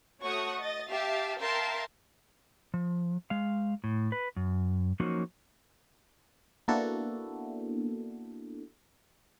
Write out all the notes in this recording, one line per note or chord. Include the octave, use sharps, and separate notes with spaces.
A3 F#4 C#5 F#5 C#6 D#6
D#5 A6
G4 E5 F5 A5
A#4 E5 F5 G5 A5 C6
F3
G#3 F5
A2
B4
F#2
F3 F#3 A#3 C#4 D#4 F#4
A#3 B3 D4 E4 F#4 A4